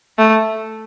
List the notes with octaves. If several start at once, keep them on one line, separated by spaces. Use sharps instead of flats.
A3